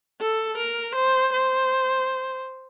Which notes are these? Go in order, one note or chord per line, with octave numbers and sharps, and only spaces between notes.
A4
A#4
C5
C5